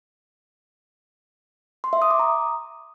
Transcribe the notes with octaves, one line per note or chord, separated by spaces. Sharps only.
C6
E5
D#6
D6
A#5